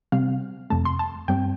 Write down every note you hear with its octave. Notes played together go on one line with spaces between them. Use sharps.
C3 G3 C4 F5
F2 C3 A3 A5
C6
A5
G2 G3 C4 G5